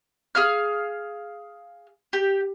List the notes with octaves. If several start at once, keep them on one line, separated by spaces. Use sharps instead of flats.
G#4 F5 F6
G4